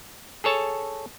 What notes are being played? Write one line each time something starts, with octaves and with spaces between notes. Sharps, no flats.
G#4 A4 C#5 A5